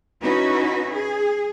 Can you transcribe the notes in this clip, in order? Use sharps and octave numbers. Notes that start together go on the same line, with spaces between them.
C#4 D#4 E4 F#4 B4
G#4